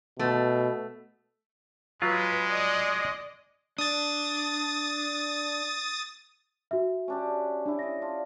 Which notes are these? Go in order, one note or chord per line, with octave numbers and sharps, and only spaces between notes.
B2 A3
F#3 G#3 F4 B4
D5 D#5
D4 D#6 A6
F#4 E5
C#4 D4 G4
C#4 D4 E4
D5 D#5 A#6
D4 F4